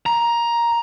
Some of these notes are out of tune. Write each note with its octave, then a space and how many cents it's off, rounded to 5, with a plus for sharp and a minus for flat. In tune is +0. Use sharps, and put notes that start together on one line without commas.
A#5 +10